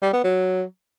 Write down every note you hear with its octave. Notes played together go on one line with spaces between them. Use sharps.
G3
B3
F#3